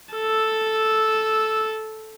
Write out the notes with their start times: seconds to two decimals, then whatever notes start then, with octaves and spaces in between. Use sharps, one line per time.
0.14 A4 E6